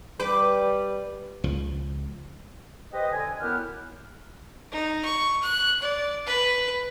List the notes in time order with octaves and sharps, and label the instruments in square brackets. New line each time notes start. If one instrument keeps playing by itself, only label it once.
[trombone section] G3 [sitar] B4 [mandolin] D6
[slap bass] C#2 F3
[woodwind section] G4 B4 C5 D#5
D3 G#5
F#2 B3 E4 G4 F#5 F6
[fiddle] D#4
C#6
F#6
D5
B4